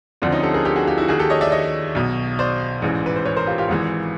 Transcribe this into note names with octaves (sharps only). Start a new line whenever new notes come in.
D2 D3 F3 C4 D4
C#4 D#4
G4 A4
G#4 A#4
G4 A4
F#4 G#4
F4 G4
E4 F#4
D#2 D#3 F#4 G#4
G4 A4
C#5 D#5
D5 E5
C#5 D#5
B1 B2
C5 D5
A1 G#2 E3
B4
C5
B4 C#5
A#4 C5
F4 G4
F4 G4
G#1 G#2 E3